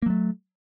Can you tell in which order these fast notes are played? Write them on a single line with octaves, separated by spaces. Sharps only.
A#3 F#3 A3